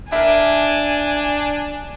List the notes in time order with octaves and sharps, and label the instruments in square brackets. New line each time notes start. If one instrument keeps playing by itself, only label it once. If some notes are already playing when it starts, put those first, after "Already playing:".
[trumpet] D4 [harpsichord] E4 A#4 [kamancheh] G#5